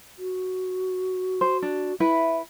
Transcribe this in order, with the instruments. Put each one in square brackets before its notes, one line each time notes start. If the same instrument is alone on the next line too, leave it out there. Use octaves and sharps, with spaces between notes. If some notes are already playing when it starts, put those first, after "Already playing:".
[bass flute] F#4
[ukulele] C5
D4
[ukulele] E4 B4 [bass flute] E5